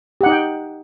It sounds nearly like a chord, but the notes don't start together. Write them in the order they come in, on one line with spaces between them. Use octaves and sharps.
G4 F#5 D#4 D#5 G5